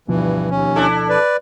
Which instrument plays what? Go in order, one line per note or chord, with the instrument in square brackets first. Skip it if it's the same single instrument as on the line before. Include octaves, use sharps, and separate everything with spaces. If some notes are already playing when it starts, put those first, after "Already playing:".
[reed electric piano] D2 B2 F3 [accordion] G2 E3
[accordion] D#2 C#4
[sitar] D4 E4 A4
[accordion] B4 D5